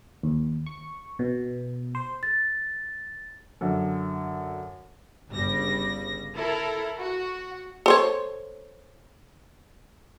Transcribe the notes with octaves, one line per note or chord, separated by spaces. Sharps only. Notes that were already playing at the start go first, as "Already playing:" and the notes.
D#2
C#6
B2
C5
A6
F#2 D3
G1 C#3 G3 A#6
E4 A4 A#4
F#4
A4 C5 C#5